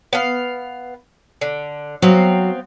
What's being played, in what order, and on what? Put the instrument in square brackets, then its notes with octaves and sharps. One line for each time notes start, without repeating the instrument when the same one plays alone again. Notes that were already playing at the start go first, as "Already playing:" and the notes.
[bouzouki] B3 F5
D3
[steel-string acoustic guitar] F#3 [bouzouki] B3 C4 F5